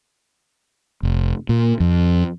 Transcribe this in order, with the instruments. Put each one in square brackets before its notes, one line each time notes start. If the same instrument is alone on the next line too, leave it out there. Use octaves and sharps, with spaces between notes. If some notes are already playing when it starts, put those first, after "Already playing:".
[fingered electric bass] F1
A#2
F2